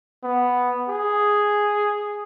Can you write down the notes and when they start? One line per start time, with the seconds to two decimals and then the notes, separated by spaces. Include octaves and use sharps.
0.24 B3
0.89 G#4